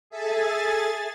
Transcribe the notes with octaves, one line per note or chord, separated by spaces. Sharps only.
G#4 A4 E5 G#5 A6